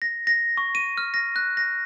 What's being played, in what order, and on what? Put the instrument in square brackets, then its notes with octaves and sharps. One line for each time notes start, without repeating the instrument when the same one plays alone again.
[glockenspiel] A#6
A#6
C#6
D#7
F6
A#6
F#6
A#6